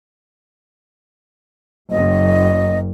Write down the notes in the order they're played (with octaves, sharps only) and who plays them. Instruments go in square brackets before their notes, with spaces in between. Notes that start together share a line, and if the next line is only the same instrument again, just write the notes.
[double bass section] F#1 F#2 [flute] D#5